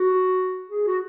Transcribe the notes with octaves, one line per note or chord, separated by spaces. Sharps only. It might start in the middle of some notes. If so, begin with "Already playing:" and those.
Already playing: F#4
G#4
F#4